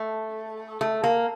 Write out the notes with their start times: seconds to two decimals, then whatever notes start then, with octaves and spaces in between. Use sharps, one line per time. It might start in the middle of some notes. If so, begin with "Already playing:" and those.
Already playing: A3
0.81 A3
1.04 A#3